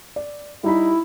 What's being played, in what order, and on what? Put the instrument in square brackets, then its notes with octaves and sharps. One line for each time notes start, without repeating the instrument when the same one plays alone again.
[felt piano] D5
[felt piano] G3 D#4 B5 [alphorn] E4